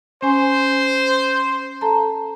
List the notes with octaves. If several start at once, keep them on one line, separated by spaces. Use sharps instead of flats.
C#4 C5 G#5
A4 A5 A#5